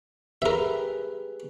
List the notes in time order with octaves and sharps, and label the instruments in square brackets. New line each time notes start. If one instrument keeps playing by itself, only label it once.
[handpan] G4 G#4 B4 [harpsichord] A#4 E5